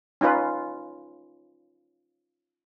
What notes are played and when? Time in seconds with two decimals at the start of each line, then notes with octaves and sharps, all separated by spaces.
0.21 C#4 D#4 F4 B4